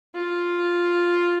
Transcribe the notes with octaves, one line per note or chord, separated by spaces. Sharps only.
F4